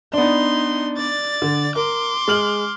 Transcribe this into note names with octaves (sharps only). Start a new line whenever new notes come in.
B3 D4 D#4 C6
D5 A6
D3
A#4 C6 D6
G#3 F6 F#7